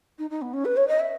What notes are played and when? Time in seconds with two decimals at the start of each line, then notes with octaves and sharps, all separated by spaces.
0.18 D#4
0.30 D#4
0.41 B3
0.53 C#4
0.65 B4
0.76 C#5
0.88 D#5
0.99 E5